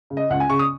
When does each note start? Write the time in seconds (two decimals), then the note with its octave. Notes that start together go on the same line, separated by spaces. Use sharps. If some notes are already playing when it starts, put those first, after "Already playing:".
0.10 C#3
0.17 D#5
0.30 C#2 F#5
0.40 G#5
0.49 C#3 C#6
0.59 D#6